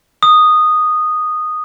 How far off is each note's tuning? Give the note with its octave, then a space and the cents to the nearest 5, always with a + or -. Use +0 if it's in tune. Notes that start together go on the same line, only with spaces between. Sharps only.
D#6 -10